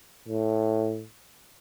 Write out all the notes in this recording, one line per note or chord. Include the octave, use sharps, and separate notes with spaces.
A2